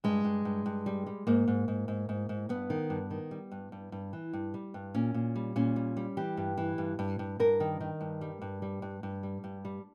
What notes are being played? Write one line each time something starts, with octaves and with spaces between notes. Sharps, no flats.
G2 G#3
G2
G2
G2
G3
G3
G#2 A#3
G#2
G#2
G#2
G#2
G#2
G2 B3
D#3
G2
D#3
G3
G2
G2
G2
E3
G2
G3
G2
A#2 C#4
A#2
G3
A#2 C#4
G3
G3
E3 G4
G2
E3
G2
G2
G2
G2 A#4
D#3
D#3
G2
G3
G2
G3
G2
G2
G3
G2
G3